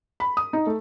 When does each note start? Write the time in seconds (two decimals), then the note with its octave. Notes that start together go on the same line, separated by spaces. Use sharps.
0.20 B5
0.37 D#6
0.53 D#4
0.67 A3